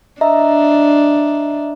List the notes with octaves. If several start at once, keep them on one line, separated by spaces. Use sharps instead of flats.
D4 D#5 E5 A#5